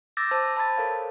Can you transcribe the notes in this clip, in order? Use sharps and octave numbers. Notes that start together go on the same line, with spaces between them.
D6 E6 G6 A6 A#6
C5 A5 E6
C5 A5 B5 G#6 A6
A4 A#4 C#5 F5